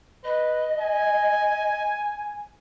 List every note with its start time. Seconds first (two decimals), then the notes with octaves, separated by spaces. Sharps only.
0.24 B4 D#5
0.79 G#5